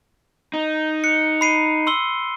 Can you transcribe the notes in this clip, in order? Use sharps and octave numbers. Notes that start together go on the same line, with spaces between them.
D#4
F#6 C#7
B5 C7 D#7
C6 E6 G7